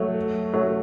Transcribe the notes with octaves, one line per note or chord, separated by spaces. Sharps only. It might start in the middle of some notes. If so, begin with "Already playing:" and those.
Already playing: F#3 A3
F#3 A3